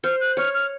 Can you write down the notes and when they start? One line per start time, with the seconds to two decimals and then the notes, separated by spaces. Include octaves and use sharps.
0.04 C5 F6
0.20 F#6
0.37 C#5 F6
0.54 F6